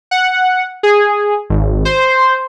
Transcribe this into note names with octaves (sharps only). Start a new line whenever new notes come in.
F#5
G#4
G#1
C5